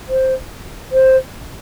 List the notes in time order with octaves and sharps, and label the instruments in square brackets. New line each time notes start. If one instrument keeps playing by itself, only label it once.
[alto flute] C5
C5